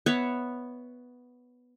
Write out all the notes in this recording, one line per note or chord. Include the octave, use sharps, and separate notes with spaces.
B3 C#5 E5